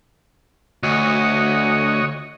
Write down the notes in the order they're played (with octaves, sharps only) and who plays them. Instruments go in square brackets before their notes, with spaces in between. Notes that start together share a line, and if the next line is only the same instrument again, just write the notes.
[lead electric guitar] D2 [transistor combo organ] F#4 C#5 D#5